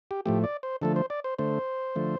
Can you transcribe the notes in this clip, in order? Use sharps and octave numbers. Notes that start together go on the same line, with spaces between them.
G4
A2 F3 A3 G4
D5
C5
D3 F3 A3 A4
C5
D5
C5
D3 A3 C5
D3 F3 A3